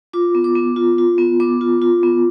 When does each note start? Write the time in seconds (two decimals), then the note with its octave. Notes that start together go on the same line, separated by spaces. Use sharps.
0.13 F4 D6
0.35 B3
0.44 D6
0.55 B3
0.76 F4
0.98 F4
1.18 B3
1.40 B3 D6
1.61 F4
1.82 F4
2.03 B3